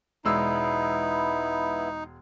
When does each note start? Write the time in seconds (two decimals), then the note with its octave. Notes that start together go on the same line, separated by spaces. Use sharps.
0.25 E1 G#3 B3 D#4 E4 E6